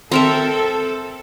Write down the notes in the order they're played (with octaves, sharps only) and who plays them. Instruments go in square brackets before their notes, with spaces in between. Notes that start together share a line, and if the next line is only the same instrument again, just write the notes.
[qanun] C4 A#4 E5 [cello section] A4